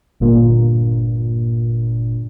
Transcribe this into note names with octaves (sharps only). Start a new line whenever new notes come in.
G1 G2 A#2